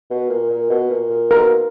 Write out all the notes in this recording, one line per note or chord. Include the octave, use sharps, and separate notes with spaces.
B2
A#2
A#2
B2
A#2
A#2
B2 A#4